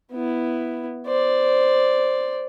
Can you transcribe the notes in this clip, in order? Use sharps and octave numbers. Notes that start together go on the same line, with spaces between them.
B3 E4
C5 D5